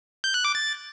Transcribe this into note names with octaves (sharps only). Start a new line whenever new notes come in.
G6
F#6
D6
A6